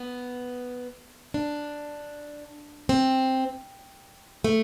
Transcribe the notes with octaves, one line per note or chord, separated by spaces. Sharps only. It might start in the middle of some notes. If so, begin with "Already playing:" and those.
Already playing: B3
D4
C4
A3